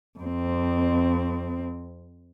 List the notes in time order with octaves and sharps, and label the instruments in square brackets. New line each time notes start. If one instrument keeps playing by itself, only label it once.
[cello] F2 C4